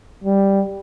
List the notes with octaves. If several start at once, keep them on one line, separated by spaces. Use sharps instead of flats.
G3